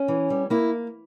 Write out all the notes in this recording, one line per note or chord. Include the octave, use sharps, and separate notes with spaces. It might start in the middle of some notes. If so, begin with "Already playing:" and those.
Already playing: C#4
E3
G3
A#3 E4